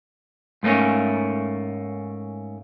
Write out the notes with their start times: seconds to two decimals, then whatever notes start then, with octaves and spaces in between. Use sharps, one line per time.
0.63 G#2 A3 A#3 C#4